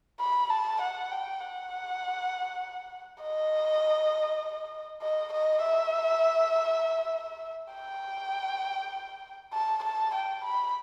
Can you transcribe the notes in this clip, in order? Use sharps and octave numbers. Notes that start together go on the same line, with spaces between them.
B5
A5
F#5
G5
F#5
D#5
D#5
D#5
E5
G5
A5
A5
G5
B5